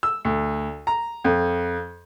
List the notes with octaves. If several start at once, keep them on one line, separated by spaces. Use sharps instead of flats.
E6
D2
A#5
F2